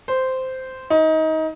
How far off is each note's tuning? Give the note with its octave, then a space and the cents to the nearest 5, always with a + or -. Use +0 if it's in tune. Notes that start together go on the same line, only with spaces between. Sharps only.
C5 -10
D#4 +25